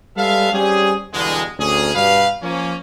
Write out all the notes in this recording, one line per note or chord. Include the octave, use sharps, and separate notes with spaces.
G3 G#3 B3 A4 E5 F5
G3 C4 C#4 G4 G#4
E2 G2 B2 D3 G#3
D2 C#4 G#4
G2 B2 B4 F5
F3 A#3 C#4